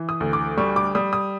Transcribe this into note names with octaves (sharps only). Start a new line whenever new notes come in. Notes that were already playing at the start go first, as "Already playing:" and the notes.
Already playing: E3
D#6
D2
D6
G3 C#6
D6
G3 D#6
D#6